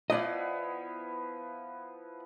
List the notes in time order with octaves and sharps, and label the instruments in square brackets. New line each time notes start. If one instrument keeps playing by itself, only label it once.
[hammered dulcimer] F3 B3 E4 [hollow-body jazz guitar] D5 D#5